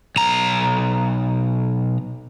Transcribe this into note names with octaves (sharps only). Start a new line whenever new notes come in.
B1 A#5